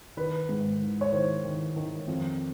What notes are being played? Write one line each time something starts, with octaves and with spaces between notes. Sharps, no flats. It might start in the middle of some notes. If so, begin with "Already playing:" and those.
D#3 B4
G#2
D#3
C#5
D#3 C5
D#3
D#3
F2